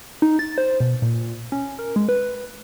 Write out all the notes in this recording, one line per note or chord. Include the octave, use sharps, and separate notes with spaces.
D#4
A6
C5
B2
A#2
C#4
A#4
G#3
B4